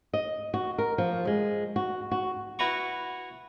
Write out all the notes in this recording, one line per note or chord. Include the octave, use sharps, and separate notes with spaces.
D#5
F#4
A#4
F3
G#3
F#4
F#4
E4 F#4 B4 A#5 C#6